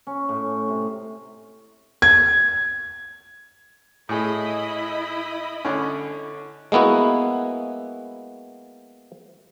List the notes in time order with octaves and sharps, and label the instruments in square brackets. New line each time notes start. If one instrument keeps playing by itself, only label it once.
[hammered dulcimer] C#4
A2
C3
[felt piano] G#6
[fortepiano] A2 G#4 [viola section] E4 D#5 B5
[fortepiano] D3 C#4
[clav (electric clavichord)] G#3 A#3 B3 E4 F#4